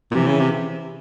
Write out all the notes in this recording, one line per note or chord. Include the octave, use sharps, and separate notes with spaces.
A#2
C3 E3
C#3
C3